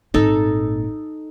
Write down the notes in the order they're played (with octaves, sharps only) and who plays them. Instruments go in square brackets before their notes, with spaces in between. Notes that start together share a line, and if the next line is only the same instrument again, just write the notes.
[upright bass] G#1 A#2 [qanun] D#4 A4